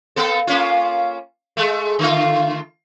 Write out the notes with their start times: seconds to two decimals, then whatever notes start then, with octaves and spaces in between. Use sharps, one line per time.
0.16 A#3 B3 A4
0.47 A#3 C#4 F4
1.57 G#3 A3
1.99 D3 A3 F4